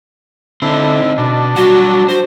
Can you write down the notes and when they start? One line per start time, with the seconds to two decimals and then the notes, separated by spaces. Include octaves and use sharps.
0.62 D3 C4 D#4 E4
1.18 B2 D4
1.56 F#3 G3 F#4 F#5
2.09 F#4 C5